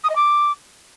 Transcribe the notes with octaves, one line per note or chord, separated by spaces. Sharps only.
D#6
D#5
D6